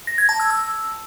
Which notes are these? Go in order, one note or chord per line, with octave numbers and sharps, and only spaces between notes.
A#6
G#6
A5
E6
E6